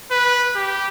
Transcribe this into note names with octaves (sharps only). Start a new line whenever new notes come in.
B4
G4